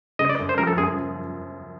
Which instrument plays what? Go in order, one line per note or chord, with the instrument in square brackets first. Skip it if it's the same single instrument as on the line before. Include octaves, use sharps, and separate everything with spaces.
[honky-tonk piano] C#3 [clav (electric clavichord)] D#5
[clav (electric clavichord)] D5
[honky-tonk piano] F#2
[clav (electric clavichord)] C5
[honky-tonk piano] F3 [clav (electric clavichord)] A#4
[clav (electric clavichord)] A4
[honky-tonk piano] F#2 [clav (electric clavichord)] G#4